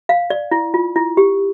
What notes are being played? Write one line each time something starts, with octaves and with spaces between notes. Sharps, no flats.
F5
D5
E4
F4
E4
G4